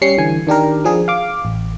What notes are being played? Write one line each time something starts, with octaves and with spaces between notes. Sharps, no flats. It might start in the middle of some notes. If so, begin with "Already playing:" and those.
G3 C#4 C7 C#7
D3 E3 G#5
D#3 D4 G4 A#4
F3 D4 G#4
F5 D6
A1